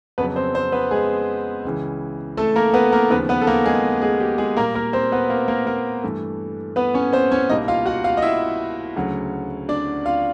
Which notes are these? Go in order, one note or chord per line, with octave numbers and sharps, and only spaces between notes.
F2 C#3 F#3 B3 B4
C4 C5
C4 C5
B3 B4
G#3 G#4
C#2 C#3 E3
A3 A4
A#3 A#4
B3 B4
A#3 A#4
D#2 C#3 F3 B3 B4
B3 B4
A4
A#3 A#4
G#3 G#4
G#3 G#4
G4
G#3 G#4
A#2 G3 A#3 A#4
A#3 A#4
C4 C5
B3 B4
A#3 A#4
A#3 A#4
A#3 A#4
G2 E3 A3
B3 B4
C#4 C#5
C4 C5
C#4 C#5
C2 B2 G3 A#3 D#4 D#5
F4 F5
F#4 F#5
F4 F5
D#5
E4 E5
D2 C#3 F#3
D4 D5
F4 F5